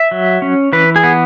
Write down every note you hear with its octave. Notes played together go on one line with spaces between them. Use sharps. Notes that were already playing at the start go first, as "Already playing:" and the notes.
Already playing: E5
F#3
C#4
E3 B4
G#4
B3